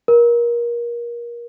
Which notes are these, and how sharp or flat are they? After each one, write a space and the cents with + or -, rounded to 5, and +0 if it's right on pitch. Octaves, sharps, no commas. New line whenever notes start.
A#4 +25